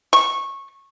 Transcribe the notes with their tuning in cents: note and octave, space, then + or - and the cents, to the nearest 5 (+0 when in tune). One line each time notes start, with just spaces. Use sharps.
C#6 -15